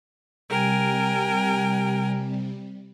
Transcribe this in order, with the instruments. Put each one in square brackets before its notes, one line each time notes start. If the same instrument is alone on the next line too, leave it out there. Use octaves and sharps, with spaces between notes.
[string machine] C3 G3 [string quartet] A#4 G5 G#5